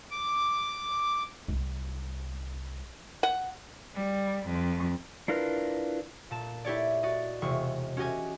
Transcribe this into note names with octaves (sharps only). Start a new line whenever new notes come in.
D6
C2
F#5
G3
F2
D4 E4 F4 A#4 B4
A#2 A5 E7
E4 G4 C#5 D5
F#4 D5 D#5
E1 C3 C#6
C#4 F#4 G4 D#5 G#5